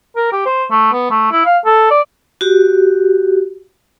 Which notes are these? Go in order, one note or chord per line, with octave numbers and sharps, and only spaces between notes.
A#4
G4
C5
A3
B3
A3
E4
F5
A4
D5
F#4 G4